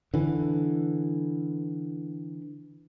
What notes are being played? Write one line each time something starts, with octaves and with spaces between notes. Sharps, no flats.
D3 E3